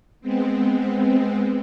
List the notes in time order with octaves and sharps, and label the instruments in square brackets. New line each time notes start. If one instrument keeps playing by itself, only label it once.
[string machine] G#3 B3 C4